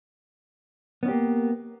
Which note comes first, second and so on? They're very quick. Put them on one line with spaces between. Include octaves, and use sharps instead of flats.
B3 C#4 G4 A#3